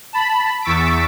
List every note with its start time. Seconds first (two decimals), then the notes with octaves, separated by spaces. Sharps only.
0.13 A5 B5
0.62 E2 C#6 E6 A6 B6 D7